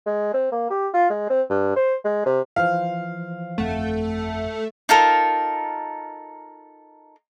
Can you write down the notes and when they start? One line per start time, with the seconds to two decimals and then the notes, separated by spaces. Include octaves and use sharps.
0.06 G#3
0.34 C4
0.52 A#3
0.70 G4
0.94 F4
1.10 G#3
1.30 C4
1.50 G2
1.76 C5
2.05 G#3
2.26 C3
2.56 E3 F3 C5 F5
3.58 G1 F2 A3 F#5
4.89 D#4 F4 A4 A#4